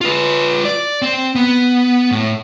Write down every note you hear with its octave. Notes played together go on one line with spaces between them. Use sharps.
F4 B4
D5
C4
B3
A2